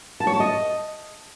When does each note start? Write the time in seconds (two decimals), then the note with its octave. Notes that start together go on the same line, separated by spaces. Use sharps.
0.20 A5
0.27 C#5
0.33 A5
0.40 D#5